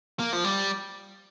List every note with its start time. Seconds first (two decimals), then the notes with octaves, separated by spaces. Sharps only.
0.19 A#3
0.33 F3
0.44 G3